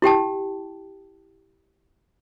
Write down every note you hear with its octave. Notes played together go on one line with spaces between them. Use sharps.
E4 G4 G5 A5